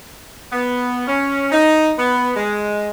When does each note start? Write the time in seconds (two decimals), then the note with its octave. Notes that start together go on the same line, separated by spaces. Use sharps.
0.52 B3
1.08 C#4
1.52 D#4
1.99 B3
2.36 G#3